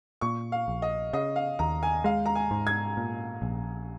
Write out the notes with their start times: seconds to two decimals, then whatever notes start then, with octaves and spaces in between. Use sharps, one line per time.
0.21 A#2 C#6
0.52 F5
0.68 A#1
0.82 D#5
1.13 C#3 D#5
1.36 F5
1.59 D#2 A#5
1.83 G#5
2.04 G#3 F5
2.26 A#5
2.35 G#5
2.51 G#2
2.67 G#6
2.97 A#2
3.42 A#1